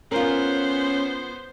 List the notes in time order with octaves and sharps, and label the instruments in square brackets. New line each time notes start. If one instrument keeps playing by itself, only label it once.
[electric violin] B3 C5 [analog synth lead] C#4 [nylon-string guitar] F4 A#4